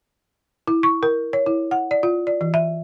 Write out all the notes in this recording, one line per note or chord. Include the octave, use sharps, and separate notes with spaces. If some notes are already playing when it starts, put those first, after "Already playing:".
E4
C#6
A#4
C#5
E4
F#5
D5
F4
D5
E3
E5